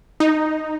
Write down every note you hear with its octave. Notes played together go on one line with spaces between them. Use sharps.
D#4